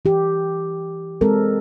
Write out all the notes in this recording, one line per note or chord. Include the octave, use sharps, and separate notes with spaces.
E3 G4
G#3 C4 A4 A#4